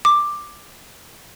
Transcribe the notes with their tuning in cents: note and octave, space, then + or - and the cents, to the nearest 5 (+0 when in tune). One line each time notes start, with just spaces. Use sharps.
D6 +10